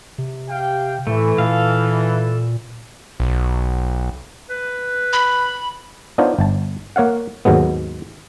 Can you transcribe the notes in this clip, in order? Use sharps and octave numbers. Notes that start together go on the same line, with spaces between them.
C3
G4 F5 G5
A2 E3 A3
A#2 A4 F5
B1
B4
B5
B3 D4 D#4 F4 C5 C#5
G1 A5
A#3 C#5 F5 F#5
D#2 G#2 F#3 G#3 B3